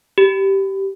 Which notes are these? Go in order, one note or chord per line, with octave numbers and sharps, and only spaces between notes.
G4